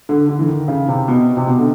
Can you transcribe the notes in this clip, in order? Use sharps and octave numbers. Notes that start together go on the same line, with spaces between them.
D3
D3
E3
D#3
C#3
C3
B2
C3
B2
D3